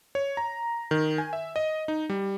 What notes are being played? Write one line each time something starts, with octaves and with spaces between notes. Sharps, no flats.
C#5
A#5
D#3
G#5
E5
D#5
D#4
G3